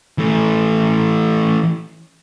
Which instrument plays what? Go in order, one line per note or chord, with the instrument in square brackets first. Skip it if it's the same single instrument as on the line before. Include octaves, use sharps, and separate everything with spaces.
[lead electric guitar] E3 A3